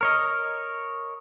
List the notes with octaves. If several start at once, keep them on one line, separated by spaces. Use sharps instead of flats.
A#4 C#5 D#5 F6